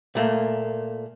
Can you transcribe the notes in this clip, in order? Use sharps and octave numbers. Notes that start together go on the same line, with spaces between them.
A#2 A3 A#3